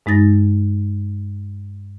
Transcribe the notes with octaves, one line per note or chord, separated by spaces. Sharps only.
G2 G#3 D#4 A6 A#6